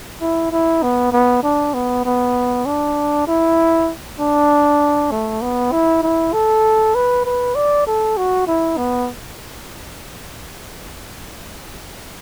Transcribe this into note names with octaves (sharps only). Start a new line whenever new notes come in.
E4
E4
B3
B3
D4
B3
B3
D4
E4
D4
A3
B3
E4
E4
A4
B4
B4
D5
A4
F#4
E4
B3